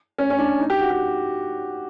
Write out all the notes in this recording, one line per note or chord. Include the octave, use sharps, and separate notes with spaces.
C#4
C#4
D4
D#4
G4
F#4
G4